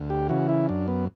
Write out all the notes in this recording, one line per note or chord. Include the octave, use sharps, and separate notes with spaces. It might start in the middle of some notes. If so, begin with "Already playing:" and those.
Already playing: D2
G4
C#3 E3 F#4
E4
F#2 D4
B3